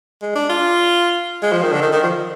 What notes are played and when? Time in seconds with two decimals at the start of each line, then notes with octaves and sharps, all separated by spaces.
0.22 G#3
0.36 D4
0.49 F4
1.42 G#3
1.52 F3
1.62 D#3
1.72 D3
1.82 D#3
1.92 D#3
2.03 F3